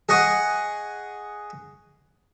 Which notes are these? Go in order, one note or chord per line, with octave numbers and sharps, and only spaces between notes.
G#4 D#5 F#5 C#6 D#6